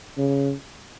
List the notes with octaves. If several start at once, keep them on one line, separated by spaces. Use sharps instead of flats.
C#3